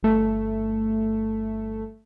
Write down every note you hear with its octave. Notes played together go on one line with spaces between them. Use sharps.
G1 A3